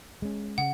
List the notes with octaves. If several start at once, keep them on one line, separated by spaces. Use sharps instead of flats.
G#3 C#4
C#3 F#5